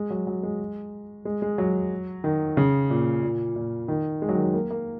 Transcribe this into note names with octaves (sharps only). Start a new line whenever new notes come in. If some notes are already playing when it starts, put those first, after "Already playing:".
Already playing: G#3
F#3
F#3
G#3
G#3
G#3
F#3
D#3
C#3
A#2
A#2
A#2
D#3
G#3
F#3
D#3
F#3
A#3
A#3